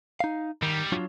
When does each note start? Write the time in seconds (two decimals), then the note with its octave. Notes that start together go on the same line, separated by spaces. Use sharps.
0.20 D#4 F5
0.62 G#2 D#3 G3
0.92 F#3 D4 F4